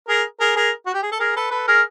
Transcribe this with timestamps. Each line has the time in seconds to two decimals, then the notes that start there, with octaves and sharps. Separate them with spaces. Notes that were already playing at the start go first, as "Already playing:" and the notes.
0.08 G#4 A#4
0.40 G#4 A#4
0.56 G#4 A#4
0.86 F#4
0.94 G4
1.02 G#4
1.12 A4
1.19 G#4 A#4
1.36 A4 B4
1.51 A4 B4
1.67 G#4 A#4